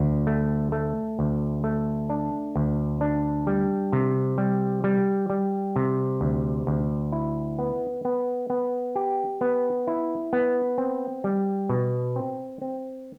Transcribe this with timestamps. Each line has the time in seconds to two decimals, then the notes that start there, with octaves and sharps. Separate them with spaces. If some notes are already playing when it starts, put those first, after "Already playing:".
Already playing: D2
0.27 A3
0.72 A3
1.19 D2
1.64 A3
2.10 D4
2.56 D2
3.01 D4
3.47 G3
3.93 C3
4.38 G3
4.84 G3
5.30 G3
5.76 C3
6.21 D2
6.67 D2
7.12 E4
7.59 B3
8.05 B3
8.50 B3
8.95 G4
9.41 B3
9.87 E4
10.33 B3
10.78 C4
11.24 G3
11.69 B2
12.16 C4
12.62 C4